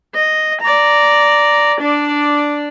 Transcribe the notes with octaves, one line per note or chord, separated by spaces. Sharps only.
D#5
D5 A#5
D4 D5